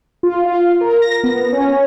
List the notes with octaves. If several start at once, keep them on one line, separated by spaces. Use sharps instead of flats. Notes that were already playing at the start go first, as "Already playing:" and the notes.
F4
F4
A#4
A#6
B3
C#4